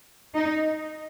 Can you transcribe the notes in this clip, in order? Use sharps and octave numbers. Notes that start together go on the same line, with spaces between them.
D#4